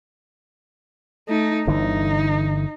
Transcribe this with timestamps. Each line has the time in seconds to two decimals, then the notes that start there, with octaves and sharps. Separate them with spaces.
1.28 A3 D#4
1.67 G1 D3 E3 D#4